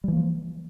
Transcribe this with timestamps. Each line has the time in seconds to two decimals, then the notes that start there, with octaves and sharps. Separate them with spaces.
0.04 G3
0.08 E3
0.12 A#3
0.17 F3